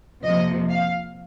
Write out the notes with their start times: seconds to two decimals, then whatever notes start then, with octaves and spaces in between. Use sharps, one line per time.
0.24 F2 C3 F3 A#3 D#5
0.69 F5